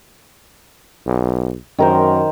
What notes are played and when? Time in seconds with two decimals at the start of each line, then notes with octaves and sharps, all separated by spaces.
1.06 B1
1.78 F#2 D#3 A#4 C5